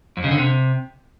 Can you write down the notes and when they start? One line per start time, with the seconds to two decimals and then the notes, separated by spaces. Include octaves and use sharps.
0.17 F2
0.24 C#3
0.31 D3
0.38 C3